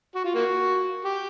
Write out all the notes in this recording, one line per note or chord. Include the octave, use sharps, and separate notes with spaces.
F#4
F4
A#3 F#4
G4